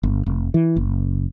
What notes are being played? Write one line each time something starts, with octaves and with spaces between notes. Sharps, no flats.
G1
F1
E3
F#1